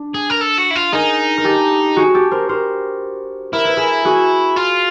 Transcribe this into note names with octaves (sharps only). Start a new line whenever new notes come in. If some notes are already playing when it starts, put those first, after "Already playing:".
Already playing: D4
G#4
A#4
A4
F#4
E4
F4
D#4 G#4 A#4
A#4
G4 A4
F#4 G#4
G4 A4
A#4 C5
A#4 C5
E4 A#4
B4
G#4 A#4
F#4 G#4
F4